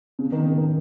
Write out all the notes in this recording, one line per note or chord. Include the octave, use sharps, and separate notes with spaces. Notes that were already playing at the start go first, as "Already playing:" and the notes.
C#3
D#3
C#3
D#3